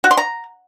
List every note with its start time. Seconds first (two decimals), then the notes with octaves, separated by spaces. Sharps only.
0.04 F#4
0.11 C6
0.17 A#5